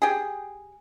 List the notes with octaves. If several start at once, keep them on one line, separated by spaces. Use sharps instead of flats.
G4 G#4